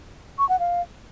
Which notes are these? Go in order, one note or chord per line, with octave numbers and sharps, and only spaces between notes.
C#6
F#5
F5